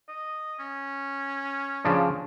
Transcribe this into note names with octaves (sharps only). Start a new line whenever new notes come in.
D#5
C#4
C#3 F3 D4